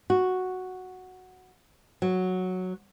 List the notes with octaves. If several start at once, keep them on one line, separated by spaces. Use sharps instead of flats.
F#4
F#3